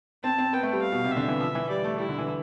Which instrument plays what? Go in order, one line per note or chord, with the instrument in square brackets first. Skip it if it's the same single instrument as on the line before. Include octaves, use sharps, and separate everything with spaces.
[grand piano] C4 [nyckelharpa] A5
[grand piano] C4
[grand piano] B3 [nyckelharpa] G5
[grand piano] A3
G3
[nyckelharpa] F5
[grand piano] B2
C3
[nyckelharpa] E5
[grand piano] D3
E3
F3
E3
[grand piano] G3 [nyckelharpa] D5
[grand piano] A3
[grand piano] G3 [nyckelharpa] E4
[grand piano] D3
E3